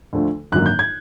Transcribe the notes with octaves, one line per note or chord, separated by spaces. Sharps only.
D2 D3 F3 A3
G#1 F#2 D3 F#3 A#3 F#6
G6
G#6